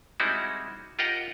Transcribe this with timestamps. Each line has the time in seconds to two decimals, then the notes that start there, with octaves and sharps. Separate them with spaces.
0.20 G3 G#3 C4 D#4 E4 F#4
0.99 F4 G4 A#4 D#5 F#5 G5